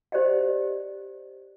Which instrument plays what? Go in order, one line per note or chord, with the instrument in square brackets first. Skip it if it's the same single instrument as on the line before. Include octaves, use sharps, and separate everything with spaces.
[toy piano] G4 C5 D5 D#5 F5